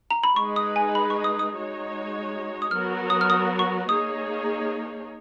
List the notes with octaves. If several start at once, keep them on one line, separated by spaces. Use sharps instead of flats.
A#5
B5
G#3 D#4 G#4 B4 C#6
D#6
G#5
B5
C#6
D#6
D#6
G#3 D#4 F#4 C#5
D#6
F#3 B3 F#4 A#4 F6
D#6
F6
D#6
C#6
A#3 D#4 G#4 C#5 D#6